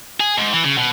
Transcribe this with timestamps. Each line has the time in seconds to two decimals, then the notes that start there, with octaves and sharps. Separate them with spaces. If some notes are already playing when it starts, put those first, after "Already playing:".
0.20 G#4
0.38 G#2
0.53 E3
0.65 C#3
0.78 B2